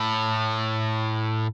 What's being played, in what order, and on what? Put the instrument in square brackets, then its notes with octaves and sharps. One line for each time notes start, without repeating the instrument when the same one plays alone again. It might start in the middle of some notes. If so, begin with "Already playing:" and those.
Already playing: [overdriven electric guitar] A2